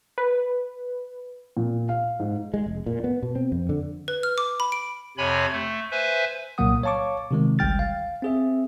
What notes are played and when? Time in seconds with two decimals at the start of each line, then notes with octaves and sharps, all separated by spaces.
0.18 B4
1.57 A#2
1.89 F5
2.20 G#2
2.54 G#3
2.66 F1
2.86 A#2
3.04 B3
3.23 B2
3.35 C4
3.52 F2
3.69 D3
4.08 B4
4.23 F6
4.38 D6
4.60 B5
4.72 D7
5.17 F2 C3 C#5 G#5 B5
5.52 A3
5.91 B4 C5 E5 G#5
6.58 C2 A#2 F#3 A#3 F#5 D#6
6.83 C#5 F5 A5 C#6 D6
7.31 C3 D#3 G#3
7.59 G1 C#2 G3 G5 F6 A6
7.79 F5
8.22 C4 G#4 E5